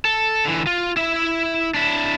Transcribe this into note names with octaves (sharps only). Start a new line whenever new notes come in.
A4
D3 E3
F4
E4 E5
D4 E4